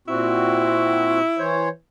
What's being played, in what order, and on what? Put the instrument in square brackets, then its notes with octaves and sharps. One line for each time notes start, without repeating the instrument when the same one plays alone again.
[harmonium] A#2 C4 F#4 [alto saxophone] E4
[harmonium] E3 C5 C#5